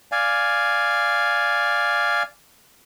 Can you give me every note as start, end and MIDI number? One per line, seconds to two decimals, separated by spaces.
0.12 2.23 74
0.12 2.23 77
0.12 2.23 80